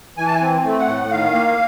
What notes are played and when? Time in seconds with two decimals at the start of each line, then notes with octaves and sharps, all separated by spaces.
0.18 E3 G#5
0.26 A5
0.35 G#5
0.41 C4
0.64 A3
0.79 F#5
0.87 A2
1.11 D#3 F5
1.33 A#3